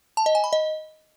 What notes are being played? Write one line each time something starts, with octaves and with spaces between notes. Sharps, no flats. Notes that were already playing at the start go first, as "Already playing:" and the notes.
A5
D#5
G#5
B5
D#5